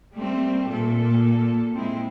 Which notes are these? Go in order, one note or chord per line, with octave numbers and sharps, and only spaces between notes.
G3 A3 A#3 C4
A#2 A4
G#3 C4 E4